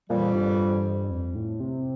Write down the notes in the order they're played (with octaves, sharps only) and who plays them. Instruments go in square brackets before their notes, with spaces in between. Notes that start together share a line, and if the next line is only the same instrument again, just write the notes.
[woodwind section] F2 E3 G3 [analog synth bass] A#2
[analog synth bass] G2
F2
A2
C3